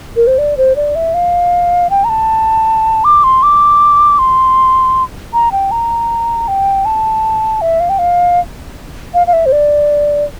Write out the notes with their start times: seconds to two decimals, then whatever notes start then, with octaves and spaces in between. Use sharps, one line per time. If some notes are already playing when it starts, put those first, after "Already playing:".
0.16 A#4
0.27 C5
0.38 D5
0.57 C5
0.76 D5
0.95 E5
1.14 F5
1.90 G5
2.04 A#5
2.09 A5
3.04 D6
3.24 C6
3.43 D6
4.19 C6
5.33 A#5
5.52 G5
5.71 A#5
6.48 G5
6.85 A5
7.61 E5
7.80 F5
7.89 G5
7.99 F5
9.14 F5
9.27 F5
9.33 E5
9.46 C5
9.52 D5